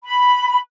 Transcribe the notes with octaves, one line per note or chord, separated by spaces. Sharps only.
B5